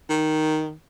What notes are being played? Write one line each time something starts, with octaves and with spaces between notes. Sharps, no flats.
D#3